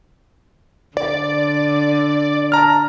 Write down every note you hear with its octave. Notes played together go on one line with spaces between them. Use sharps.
D3 D5
A5 A#5 F6